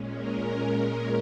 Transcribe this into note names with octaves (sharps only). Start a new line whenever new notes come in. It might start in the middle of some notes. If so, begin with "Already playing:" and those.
Already playing: A#2 G#3 C#4
A#4